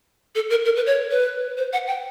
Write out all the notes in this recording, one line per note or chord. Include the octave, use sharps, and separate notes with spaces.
A4
A#4
A#4
B4
C#5
B4
C5
F#5
G5